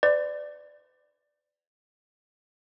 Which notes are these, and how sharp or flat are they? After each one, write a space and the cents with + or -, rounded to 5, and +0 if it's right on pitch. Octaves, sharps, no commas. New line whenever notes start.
B4 +45 D5 +5